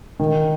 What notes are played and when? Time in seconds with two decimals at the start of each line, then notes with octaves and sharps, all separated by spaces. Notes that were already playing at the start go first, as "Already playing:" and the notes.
0.19 D#3